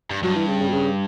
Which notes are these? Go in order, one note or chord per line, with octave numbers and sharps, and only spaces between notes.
G2
G2 F#3
E3
C#3
C#3
B2
C#3